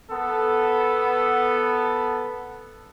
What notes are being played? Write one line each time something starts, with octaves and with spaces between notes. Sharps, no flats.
B3 A4